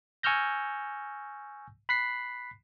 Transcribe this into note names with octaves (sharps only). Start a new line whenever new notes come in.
G#5 C#6 E6 F6 G6 A#6
B5 F#6 B6 C7